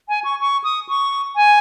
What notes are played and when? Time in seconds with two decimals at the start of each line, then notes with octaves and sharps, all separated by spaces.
0.09 G#5
0.24 C#6
0.41 C#6
0.64 D#6
0.89 C#6
1.36 G#5